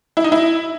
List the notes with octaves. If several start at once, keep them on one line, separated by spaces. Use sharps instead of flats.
E4
D#4
E4